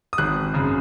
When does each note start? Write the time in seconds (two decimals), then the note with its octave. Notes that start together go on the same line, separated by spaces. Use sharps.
0.13 D#6
0.18 G#1 F#6
0.54 F#2 C#3